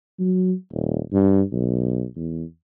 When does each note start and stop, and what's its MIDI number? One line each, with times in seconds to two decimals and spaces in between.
0.19 0.53 54
0.72 0.99 27
1.13 1.42 43
1.52 2.05 35
2.16 2.44 40